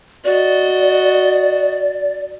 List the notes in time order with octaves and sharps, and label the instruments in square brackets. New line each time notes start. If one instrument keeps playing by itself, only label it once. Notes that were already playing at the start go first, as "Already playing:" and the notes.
[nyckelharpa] F#4 D#5 [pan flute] D5